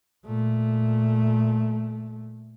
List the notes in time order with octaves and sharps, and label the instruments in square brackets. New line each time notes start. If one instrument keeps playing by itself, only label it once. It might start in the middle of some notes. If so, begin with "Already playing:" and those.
[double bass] A#2 A3